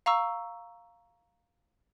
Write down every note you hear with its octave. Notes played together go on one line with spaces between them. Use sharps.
F5 A#5 C#6 E6